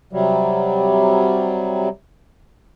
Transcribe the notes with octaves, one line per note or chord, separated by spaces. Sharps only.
C3 F#3 G3